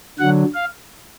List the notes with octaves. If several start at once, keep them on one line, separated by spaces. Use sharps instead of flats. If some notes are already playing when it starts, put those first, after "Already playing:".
D3 F#3 F#5
F5